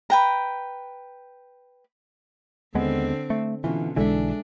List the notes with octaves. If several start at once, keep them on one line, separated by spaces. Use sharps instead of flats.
B4 G5 A#5
D#2 D3 G#3 B3 C4
A3
B2 D3 E3 C#4 F4
B1 D3 E3 G#3 D4 A4 E5